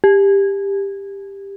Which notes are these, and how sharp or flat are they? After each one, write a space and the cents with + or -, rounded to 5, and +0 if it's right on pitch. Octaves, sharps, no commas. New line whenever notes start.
G4 +15